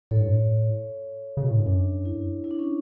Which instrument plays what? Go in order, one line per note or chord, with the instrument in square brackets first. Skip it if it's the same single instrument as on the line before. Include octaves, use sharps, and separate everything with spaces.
[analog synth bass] A2 [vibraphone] A4 C#5
[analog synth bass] G2
A2
C#3
B2
A2
G2
[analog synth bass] F#2 [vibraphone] D4
[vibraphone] E4
E4
D4
C#4